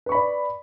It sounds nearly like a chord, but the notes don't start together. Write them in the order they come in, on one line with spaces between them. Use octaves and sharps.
B4 C#6 B5 D5